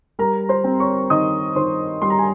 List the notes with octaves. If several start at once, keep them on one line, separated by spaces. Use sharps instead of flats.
G3 A#4 A#5
C5 C6
C4
C#5 C#6
D#3 D#5 D#6
D#3 C5 C6
G3 C6
A#5
G#5